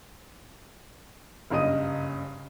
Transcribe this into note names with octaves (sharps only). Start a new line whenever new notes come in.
F#1 G2 C#3 D#5 D#6 D#7